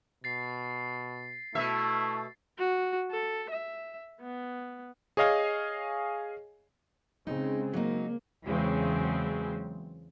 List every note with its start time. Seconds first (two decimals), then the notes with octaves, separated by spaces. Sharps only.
0.24 B2 A6 C7
1.55 B2 A3 E4 E5
2.58 F#4
3.11 A4
3.50 E5
4.21 B3
5.17 G#4 C#5 D#5 F5 G#5
7.27 C#3 G#3 C4 D#4
7.73 F#3 A#3 D#4
8.46 E2 C#3 E3 F#3 G#3 C4